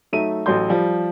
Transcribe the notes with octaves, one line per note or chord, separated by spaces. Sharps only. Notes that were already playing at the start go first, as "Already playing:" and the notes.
F#3 A3 D#4 E5 D#7
A1 F#3 A4 C6 G6
F3 G3